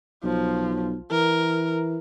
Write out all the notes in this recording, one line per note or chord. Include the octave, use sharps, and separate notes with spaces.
B1 F3
E3 A#4